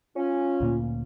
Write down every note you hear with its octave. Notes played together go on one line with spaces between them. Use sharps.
C#4 F4
D2 A#2 A#3